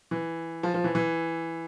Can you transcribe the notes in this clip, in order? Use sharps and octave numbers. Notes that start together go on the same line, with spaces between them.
E3
F3
F3
E3
E3